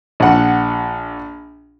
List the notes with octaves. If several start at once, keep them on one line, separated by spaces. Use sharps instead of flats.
A#1 F#5